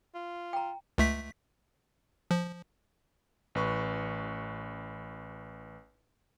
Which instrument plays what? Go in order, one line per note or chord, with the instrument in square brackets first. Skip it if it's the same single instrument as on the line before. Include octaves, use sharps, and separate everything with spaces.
[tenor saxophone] F4
[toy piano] G5 A#5
[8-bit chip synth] C#2 A3 B6
F3
[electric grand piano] A1 B4 C#6